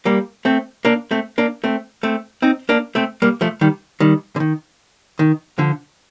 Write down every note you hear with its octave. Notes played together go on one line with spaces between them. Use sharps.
G3 A#3
A3 C4
A#3 D4
A3 C4
A#3 D4
A3 C4
A3 C4
C4 D#4
A#3 D4
A3 C4
G3 A#3
F3 A3
D#3 G3
D#3 G3
D3
D#3
D#3
D3 F3